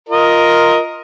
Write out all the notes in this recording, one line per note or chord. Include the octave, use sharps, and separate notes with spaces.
F4 A#4 D#5